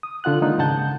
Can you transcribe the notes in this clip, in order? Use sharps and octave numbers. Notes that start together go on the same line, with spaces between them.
D#6
D3 F4 F#5 F#6
D#3 G#3 A#3 D4 D#4 F4
G#2 C#3 F#5 A5 G6